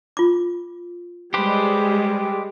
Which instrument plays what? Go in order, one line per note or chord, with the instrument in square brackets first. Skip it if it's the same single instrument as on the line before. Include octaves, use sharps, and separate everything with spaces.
[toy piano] F4 D6
[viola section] G3 G#3 [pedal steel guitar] G4 B4 C5